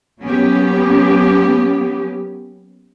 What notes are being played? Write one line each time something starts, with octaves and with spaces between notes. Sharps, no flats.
F#3 A#3 B3 C#4 G4